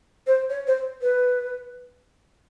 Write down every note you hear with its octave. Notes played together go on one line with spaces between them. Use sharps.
C5
C#5
C5
B4